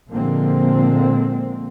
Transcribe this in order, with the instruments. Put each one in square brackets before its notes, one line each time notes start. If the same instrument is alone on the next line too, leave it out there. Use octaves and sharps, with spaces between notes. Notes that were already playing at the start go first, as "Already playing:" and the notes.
[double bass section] A#2 D3 F3 G#3 A#3 C4